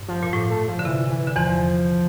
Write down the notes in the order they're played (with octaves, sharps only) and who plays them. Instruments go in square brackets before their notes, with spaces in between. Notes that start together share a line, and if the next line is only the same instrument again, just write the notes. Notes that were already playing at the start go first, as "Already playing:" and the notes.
Already playing: [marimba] G2
[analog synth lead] F3
[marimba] A#2
[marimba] A2 [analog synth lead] F3
[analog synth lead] A3
F3
[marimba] D3
[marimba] C3 [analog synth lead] E3
[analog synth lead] E3
[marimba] D3
[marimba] E2 E3 [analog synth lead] F3